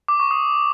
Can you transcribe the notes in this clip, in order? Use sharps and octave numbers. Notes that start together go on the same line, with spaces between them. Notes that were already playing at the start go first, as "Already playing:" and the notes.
D6
C#6
D#6